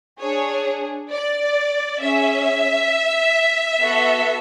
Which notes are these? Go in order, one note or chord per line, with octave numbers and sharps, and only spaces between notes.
D4 G#4 C#5
D5
C#4 G#4 E5
B3 F#4 A4